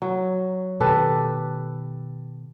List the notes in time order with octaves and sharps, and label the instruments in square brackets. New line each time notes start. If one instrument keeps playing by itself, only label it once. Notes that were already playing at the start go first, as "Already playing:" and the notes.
[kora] F#3
[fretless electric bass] B2 D#3 [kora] G4 A4 B4